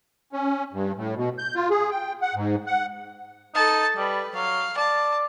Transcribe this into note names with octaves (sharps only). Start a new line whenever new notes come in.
C#4
G2
A2
B2
G6
F4
G#4
G5
F#5
G#2
F#5
D#4 A4 A5
G3 B4
F#3 F5
D5 A5